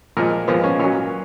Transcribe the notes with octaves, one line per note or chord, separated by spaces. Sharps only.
A#2 F3 G#3 A#4
A#2 F3 G#3 B3
C#4
A#2 F#3 C#4